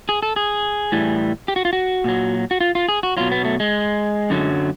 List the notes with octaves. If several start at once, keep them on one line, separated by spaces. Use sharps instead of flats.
G#4
A4
G#4
A2 E3 G3
G4
F#4
F4
F#4
A#2 F#3
F#4
F4
F4
G#4
F#4
B2 F#3 F4
B3
A3
G#3
F#2 D3 F#3